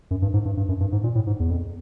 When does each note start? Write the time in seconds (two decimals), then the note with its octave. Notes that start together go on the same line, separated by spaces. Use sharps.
0.11 F#2
0.22 G2
0.34 G#2
0.45 G2
0.57 G2
0.69 F#2
0.80 G2
0.92 G#2
1.04 A#2
1.15 A2
1.27 G#2
1.40 E2
1.50 F2